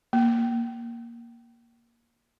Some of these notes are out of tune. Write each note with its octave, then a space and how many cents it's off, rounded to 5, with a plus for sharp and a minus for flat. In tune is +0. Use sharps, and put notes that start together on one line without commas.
A#3 +5